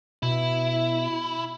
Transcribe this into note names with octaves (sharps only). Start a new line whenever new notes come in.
B2 E4